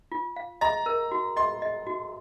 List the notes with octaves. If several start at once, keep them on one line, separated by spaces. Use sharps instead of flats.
F4
F5
D#5 A#5
A#4
F#4
D#5 C6
D#5
F#4